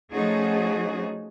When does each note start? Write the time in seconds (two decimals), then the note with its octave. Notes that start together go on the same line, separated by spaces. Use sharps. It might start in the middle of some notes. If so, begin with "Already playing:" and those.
0.11 F3 A3 C#4 D#4 F#4 G#4